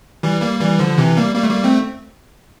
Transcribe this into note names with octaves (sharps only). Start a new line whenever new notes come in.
E3 G3
G3 A#3
E3 G3
D3 F3
C3 E3
G3 A#3
G3 A#3
A3
G3 A#3
A3 C4